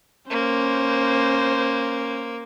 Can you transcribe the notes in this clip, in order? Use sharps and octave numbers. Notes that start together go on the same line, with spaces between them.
A#3 C#4 C5